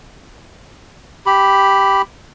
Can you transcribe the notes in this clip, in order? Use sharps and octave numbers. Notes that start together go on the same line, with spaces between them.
G4 B5